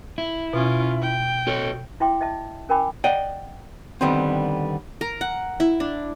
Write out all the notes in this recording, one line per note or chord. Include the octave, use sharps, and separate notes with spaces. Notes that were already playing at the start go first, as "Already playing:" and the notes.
E4
B2 C#4 F4
G5
F#4 A4 C#5
E4 E5 G5 C6 D6
D#5 E5 A5
C#4 A#4 G5 G#5 B5 D6
D5 D#5 F#5 G5
D3 D#3 G3 B3 C4
A#4
F#5
E4
D4